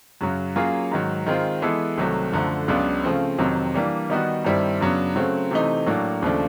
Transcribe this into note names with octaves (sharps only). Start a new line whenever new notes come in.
F#2 C#3 F#3
F#3 A#3 C#4 F4 G#4
G#2 D#3 F#3
D#3 G#3 C4 F4
E3 G#3 B3 E4 A4
C2 C3 D#3 F#3 A3
F#2 D3 F3 A3
C#2 C#3 F#3 B3 D4
C#3 F3 A3 C4
F2 C3 D#3 F#3
E3 G3 A#3 D4
D#3 G3 B3 D#4 F#4
G2 D#3 G3 C4 E4
F#2 C#3 F#3 B3 D4
C#3 F#3 A3 C4
C3 E3 A3 C4 D#4
A2 F#3 A#3 D4
D#2 C#3 F3 A3 D4